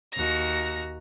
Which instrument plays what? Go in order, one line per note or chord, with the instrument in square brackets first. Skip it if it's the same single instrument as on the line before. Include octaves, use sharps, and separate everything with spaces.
[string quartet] D#2 F#4 A#5 A#6